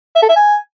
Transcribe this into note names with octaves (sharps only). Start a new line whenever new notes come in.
E5
A4
E5
G#5